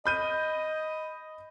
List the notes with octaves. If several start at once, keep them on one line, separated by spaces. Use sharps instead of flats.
D#5 B5 G6 D#7